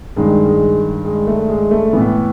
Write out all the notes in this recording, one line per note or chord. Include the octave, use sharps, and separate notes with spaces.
G2 D#3 G#3
G#3
G#3
A3
G#3
A3
A2 E3 B3